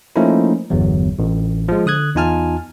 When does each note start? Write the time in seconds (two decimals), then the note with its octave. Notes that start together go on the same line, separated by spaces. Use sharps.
0.16 F3 A3 A#3 C#4 D#4 E4
0.70 G1 E2 F#3
1.19 A1
1.69 F3 G#3
1.86 D3 D#6 F#6 G#6
2.16 E2 D#4 F4 G#5 A5 F6